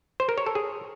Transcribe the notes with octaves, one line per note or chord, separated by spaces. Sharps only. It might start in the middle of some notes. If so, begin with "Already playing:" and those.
C5
A#4
C#5
A4
G#4